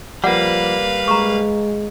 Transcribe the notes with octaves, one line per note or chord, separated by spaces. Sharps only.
F3 G3 A#3 B4 F5 F#5
G#3 A#5 C#6